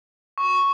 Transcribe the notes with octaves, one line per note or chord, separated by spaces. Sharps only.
C#6